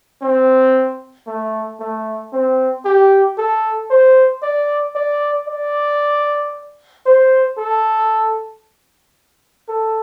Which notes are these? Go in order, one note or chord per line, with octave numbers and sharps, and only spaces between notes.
C4
A3
A3
C4
G4
A4
C5
D5
D5
D5
C5
A4
A4